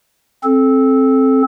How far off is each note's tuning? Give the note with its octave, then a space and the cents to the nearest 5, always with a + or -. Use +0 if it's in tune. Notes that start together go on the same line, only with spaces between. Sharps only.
C4 +15 A4 -15